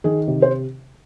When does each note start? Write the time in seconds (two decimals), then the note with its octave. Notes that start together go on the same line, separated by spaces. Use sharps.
0.04 D#3 G#4
0.28 C3
0.42 C5